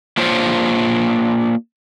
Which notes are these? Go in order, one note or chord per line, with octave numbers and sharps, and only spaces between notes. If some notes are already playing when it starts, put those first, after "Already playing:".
A#3 D4 F4 C5 C#5